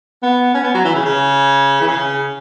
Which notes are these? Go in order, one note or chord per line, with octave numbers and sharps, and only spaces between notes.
B3
C#4
B3
F#3
E3
C#3
C#3
E3
C#3